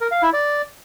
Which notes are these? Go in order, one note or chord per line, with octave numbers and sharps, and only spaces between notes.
A#4
F5
E4
D5